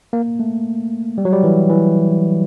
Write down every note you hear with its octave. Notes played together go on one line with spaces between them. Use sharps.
A#3
A3
G3
F#3
G3
E3
E3